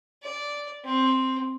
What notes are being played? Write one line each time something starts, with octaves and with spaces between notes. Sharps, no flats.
D5
C4